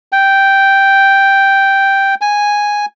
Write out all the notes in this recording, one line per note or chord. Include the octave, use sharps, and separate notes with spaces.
G5
G#5